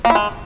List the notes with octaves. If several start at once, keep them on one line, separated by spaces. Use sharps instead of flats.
A#3
E4
G#3